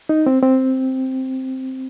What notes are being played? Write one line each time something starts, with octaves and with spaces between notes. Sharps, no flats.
D#4
C4
C4